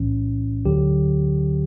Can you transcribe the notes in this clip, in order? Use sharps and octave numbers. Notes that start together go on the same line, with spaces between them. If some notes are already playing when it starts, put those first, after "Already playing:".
Already playing: B1 A2 E3 C#4
D2 D3 F#3 G4